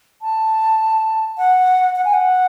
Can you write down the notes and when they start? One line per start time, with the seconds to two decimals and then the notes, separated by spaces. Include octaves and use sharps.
0.22 A5
1.38 F#5
1.96 F#5
2.05 G#5
2.14 F#5